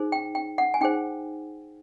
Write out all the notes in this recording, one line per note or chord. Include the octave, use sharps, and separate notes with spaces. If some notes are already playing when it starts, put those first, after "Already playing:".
Already playing: D#4 G#4 C5
G5
G5
F#5
G#5
D#4 G#4 C5 G5